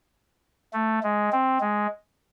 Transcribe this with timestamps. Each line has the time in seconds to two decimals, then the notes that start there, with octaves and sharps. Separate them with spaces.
0.73 A3
1.03 G#3
1.32 C4
1.61 G#3